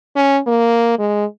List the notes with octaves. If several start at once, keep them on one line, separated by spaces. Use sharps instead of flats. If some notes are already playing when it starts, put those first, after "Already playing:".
C#4
A#3
G#3